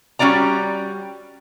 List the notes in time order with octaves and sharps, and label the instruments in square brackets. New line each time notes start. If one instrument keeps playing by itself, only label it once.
[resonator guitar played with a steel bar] G3 C#4 F#4 D5 A#5